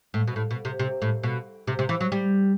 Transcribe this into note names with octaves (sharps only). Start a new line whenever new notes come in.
A2
B2
A2
B2
C3
C3
A2
B2
C3
C3
E3
F#3
G3